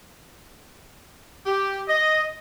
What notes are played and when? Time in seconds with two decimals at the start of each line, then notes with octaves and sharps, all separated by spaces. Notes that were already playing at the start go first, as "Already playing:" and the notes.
1.46 G4
1.89 D#5